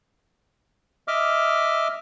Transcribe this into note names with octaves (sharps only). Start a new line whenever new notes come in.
D#5 E5 D6 F6